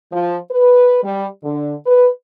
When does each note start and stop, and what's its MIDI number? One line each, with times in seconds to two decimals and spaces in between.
0.12 0.37 53
0.50 1.00 71
1.04 1.27 55
1.43 1.74 50
1.86 2.09 71